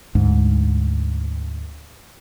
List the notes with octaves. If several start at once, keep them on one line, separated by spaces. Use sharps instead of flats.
D2 G#2